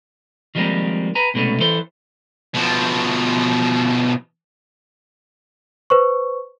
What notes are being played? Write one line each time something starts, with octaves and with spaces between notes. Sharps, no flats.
D#3 F3 G3 G#3 A#3 C4
B4 G#5 A#5
C2 B2 G#3 A3 C#4
E3 A4 C5
B2 F3
B4 C5 C#6